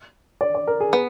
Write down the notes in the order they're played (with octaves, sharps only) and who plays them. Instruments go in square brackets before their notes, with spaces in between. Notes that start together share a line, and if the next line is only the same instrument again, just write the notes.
[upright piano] D5
D5
A#4
G#4
[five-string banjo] B3